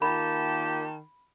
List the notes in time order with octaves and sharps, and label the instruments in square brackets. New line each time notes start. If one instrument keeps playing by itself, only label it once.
[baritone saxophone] D#3 [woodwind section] A#3 F4 G4 [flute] A5 [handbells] B5